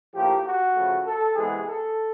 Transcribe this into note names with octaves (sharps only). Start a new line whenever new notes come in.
A2 F3 A#3 G4
F#4
C#3 F3 A3
A4
C3 E3 G#3 B3 G#4
A4